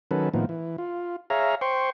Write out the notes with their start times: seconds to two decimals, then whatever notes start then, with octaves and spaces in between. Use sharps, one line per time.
0.11 D#3 F#3 C#4 A4 B4
0.34 A2 D#3 F3 A#3 B3
0.49 E3
0.78 F4
1.30 G#4 C#5 E5 F5 A#5
1.61 C5 G5 C6 C#6